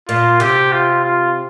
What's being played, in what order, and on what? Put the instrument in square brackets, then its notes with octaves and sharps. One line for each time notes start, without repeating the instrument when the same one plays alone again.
[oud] A#2 [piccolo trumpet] F4
[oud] C3 [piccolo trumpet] G4
[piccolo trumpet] F4
F4